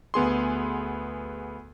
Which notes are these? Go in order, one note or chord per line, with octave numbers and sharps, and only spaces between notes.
D2 B3 G#4 C6